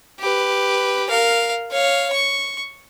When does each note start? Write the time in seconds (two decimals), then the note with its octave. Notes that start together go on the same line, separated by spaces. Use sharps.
0.19 G4 B4
1.09 A#4 F5
1.71 C#5 F5
2.12 C#6